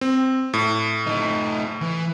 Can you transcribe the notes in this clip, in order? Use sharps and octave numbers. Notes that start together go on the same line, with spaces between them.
C4
A2
A3 D#4
E3